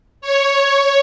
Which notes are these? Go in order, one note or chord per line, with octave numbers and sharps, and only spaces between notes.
C#5